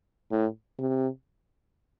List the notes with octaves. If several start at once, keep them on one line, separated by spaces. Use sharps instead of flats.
A2
C3